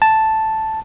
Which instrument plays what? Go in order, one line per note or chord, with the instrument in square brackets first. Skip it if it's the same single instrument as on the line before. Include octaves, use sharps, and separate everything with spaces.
[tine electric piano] A5